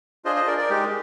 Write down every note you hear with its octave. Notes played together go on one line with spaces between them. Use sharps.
D4 F4 G#4 C5 D#5
C5 D#5
A#4 D5
A#4 D5
G#3 D#4 G4